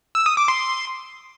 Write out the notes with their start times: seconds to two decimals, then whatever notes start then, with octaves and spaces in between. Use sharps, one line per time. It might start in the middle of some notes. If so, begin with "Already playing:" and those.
0.15 E6
0.26 D#6
0.37 D6
0.48 C6